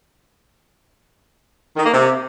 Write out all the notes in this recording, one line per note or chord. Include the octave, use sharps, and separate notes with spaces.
D#3
A#3
C3